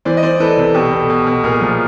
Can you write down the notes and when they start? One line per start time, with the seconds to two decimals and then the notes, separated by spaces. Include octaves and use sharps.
0.05 E3 C5 D5
0.17 D#5
0.23 E3 C5 D5
0.40 E3 A4 B4
0.57 C3
0.74 B2 G4 A4
0.92 B2
1.09 B2
1.27 B2
1.43 A#2 G#4 A#4
1.61 F3